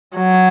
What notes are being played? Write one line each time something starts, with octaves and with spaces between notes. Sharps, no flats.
F#3